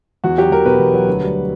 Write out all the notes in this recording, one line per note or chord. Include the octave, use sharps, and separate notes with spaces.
E2 F#4
F#3 G4
E2 A#4
B2 B4
E2
F#3
D2
G3